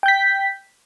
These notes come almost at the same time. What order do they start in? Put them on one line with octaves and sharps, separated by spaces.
G5 G6 B6